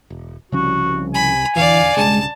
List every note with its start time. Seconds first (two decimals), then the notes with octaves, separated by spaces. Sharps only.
0.10 E1
0.52 C2 C#3 F3 C#4 F#4
1.14 G#5 B5
1.56 D#1 E2 D3 E3 D5 F5
1.96 B1 G2 C#3 G#3 A5